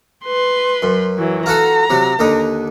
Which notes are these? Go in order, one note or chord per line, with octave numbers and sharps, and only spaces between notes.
B4 C6
F#2
E3 F#3
F4 F#4 A4 A#5
C3 F#3
D#2 D3 D#5